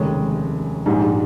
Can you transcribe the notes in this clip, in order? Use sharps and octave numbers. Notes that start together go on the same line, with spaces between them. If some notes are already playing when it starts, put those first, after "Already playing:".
Already playing: F1 D#2 C#3 G#3 C#4
A#1 G#2 G3 D#4